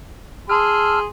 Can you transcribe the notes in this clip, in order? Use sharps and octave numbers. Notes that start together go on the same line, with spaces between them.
G#4 A5 C6 E6 F6